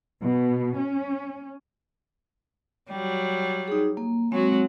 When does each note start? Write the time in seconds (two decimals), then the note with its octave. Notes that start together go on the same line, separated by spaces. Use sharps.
0.21 B2
0.77 C#4
2.90 F#3 G3
3.68 D#4 G#4
3.97 A#3
4.32 F#3 G#3 C4 F#4